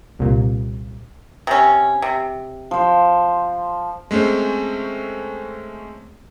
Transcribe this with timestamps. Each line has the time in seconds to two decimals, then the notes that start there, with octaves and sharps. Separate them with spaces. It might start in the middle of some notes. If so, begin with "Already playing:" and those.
0.19 C2 A#2
1.47 C3 C#4
2.02 C3
2.71 F3 C5
4.11 G#3 A3 C4 C#4 C5